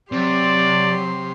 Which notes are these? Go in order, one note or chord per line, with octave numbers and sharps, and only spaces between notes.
C3 F#3 G4 D5 C6